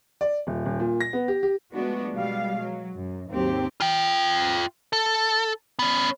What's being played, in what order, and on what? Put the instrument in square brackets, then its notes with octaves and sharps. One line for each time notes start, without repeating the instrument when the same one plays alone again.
[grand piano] D5
D#1
D#1
A#2
A#6
B3
G4
G4
[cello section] F3 G#3 A3 B3 D4 F#4
B2 G3 G#3 F5
F#3
F#2
D#2 G#2 F#3 C4 G4
[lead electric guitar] F4 G5
A4
B3 C#4